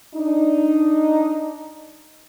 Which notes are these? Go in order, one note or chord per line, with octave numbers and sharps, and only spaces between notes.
D4 D#4